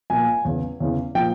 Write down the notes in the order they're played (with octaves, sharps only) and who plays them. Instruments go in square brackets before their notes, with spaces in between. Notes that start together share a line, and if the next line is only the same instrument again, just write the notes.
[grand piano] A#2 F3 G#5
E2 C#3 E3
E2 C#3 E3
A#2 F3 G5